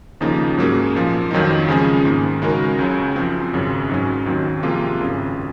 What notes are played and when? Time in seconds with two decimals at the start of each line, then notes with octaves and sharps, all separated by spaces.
0.21 D#2 C#3 F3 A#3 D#4
0.57 G#2 F#3 A#3 C#4 G#4
0.95 A#2 F3 A#3 F4
1.31 F2 D#3 F#3 C4 D#4
1.68 C#3 F3 G#3 C#4 G#4
2.05 G#2 D#3 A#3
2.42 C#3 G#3 D#4 F#4 A#4
2.79 C#2 C#3 F#3
3.16 F#2 F3 C4
3.53 G#1 F#2 C#3
3.89 G#2 F#3 C#4
4.26 D#2 D#3 F#3 C4
4.63 C3 F3 A#3 F4 G#4
5.00 G#1 F#2 C#3